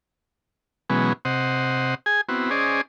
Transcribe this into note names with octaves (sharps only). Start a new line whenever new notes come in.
B2 E3 F#3 G#3 B3 C#4
C3 C5 D#5 F#5
G#4 G#5
B3 C4 E4 F#4
C#4 G#4 C5 D5 D#5